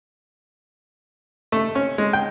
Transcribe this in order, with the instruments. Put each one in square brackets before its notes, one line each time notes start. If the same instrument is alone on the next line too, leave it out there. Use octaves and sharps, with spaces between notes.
[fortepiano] A3
C#4
G#3
G5